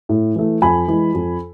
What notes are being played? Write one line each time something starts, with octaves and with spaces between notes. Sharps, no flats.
A2
E3 A3
F2 G#5 B5
E3 G#3
F2